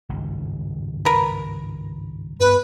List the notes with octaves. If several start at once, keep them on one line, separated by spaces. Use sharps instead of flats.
G#1 C#2 G2
A#4 B4
G2 B3 B4